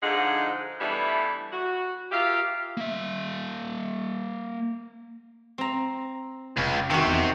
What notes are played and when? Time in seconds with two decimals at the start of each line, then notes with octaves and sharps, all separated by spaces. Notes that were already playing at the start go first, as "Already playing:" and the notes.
0.03 G#2 D3 F3 G#3 D#4 F#5
0.80 E3 G3 A3 B3 D4 E4
1.52 F#4
2.12 F4 G4 A#4 E5 F5
2.77 A#3 E5
5.58 C4 A#5
6.57 F1 C#2
6.90 C3 D#3 F#4
7.07 E2